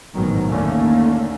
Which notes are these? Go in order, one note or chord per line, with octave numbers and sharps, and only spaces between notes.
A1 G#2 B2 D#3 F#3
D#2 D3 A3 A#3 C#4